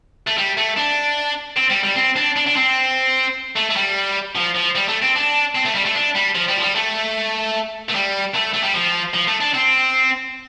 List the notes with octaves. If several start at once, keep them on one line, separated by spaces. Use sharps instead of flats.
A3
G3
A3
D4
C4
G3
G3
C4
D4
D4
D4
C4
A3
A3
G3
F3
F3
G3
A3
C4
D4
C4
A3
G3
A3
D4
G3
F3
G3
F3
G3
A3
A3
G3
A3
A3
G3
F3
F3
A3
D4
C4